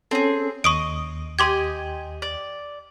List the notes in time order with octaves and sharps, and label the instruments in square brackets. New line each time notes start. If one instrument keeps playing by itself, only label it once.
[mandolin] C4 G#4 [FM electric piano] C#4 A4
[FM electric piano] D#2 [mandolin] D#5 [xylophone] C#6 D#6 D7
[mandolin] G4 D#5 G#5 [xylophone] C6 D6 G#6
[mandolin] D5